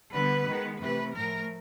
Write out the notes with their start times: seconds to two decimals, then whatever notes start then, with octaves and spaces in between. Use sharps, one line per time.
0.12 D3 G3 B3 B4
0.47 D#3 G#3 B3
0.80 C3 E3 A3 B4
1.14 A2 F3 A3 A#4